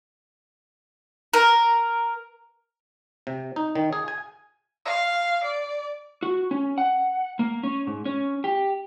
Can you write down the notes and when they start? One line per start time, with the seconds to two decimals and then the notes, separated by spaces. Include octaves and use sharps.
1.34 A#4
3.27 C3
3.56 D#4
3.75 D#3
3.93 G#4
4.08 G#5
4.85 F5
5.44 D5
6.23 F#4
6.51 C#4
6.78 F#5
7.39 A#3
7.63 C#4
7.87 G#2
8.05 C#4
8.44 G4